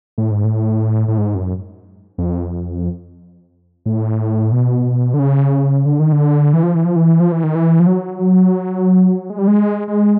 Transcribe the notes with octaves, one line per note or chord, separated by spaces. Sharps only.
A2
G#2
A2
A2
G#2
F#2
F2
A2
B2
D3
C#3
D3
D#3
D3
E3
F3
E3
F3
E3
F3
E3
D#3
E3
F3
F#3
G#3
G3
G#3
G#3